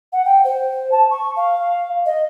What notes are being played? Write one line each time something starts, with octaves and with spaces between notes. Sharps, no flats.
F#5
G5
C5
A5
C#6
F5
D#5